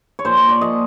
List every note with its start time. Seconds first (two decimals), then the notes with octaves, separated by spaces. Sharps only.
0.19 C#5
0.25 A#2 F3 C5
0.37 C#5
0.49 D5
0.61 A#2 F3 D#5